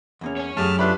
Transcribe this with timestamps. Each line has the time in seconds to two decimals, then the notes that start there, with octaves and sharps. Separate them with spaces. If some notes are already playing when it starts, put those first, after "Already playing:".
0.21 E2 A#3 C#4
0.37 C#5 G#5
0.57 F#2 A3 G4 G#4 A5 F6
0.79 A3 D4 F4 G4 B4 B5